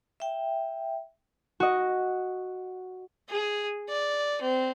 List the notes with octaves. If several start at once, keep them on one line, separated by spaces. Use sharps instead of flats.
E5 G5
F#4 D#5
G#4
D5
C4